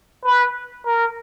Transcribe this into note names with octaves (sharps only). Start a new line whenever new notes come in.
B4
A#4